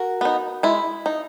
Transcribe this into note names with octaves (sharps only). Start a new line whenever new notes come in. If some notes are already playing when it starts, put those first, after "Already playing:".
Already playing: F#4 A#4
B3 D#4
G#3 E4
D#4